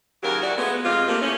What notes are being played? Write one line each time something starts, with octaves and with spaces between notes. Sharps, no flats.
D#2 C#3 F#3 A#3 G4 A#4
E3 F#4 D5
F3 G#3 A3 B3
F2 C3 F3 G#3 F4
C3 A3 A#3
A2 C#4